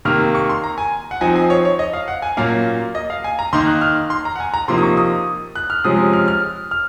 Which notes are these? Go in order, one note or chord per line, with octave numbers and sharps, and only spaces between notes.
C3 D#3 A#3 F6
C#6
C6
A#5
G#5
F#5
F3 C4 D#4 G#5
G#5
C#5
C#5
D#5
F5
F#5
G#5
A#2 F#3 A#3 C#4 F5
D#5
F5
G#5
A#5
D#3 A#3 D#4 C6
F#6
F6
C6
A#5
F#5
G#5
A#5
C3 F3 A#3 D#4 C6
D#6
C#6
D#6
F#6
F6
C3 F3 G#3 C#4 D#6
F6
F6
F6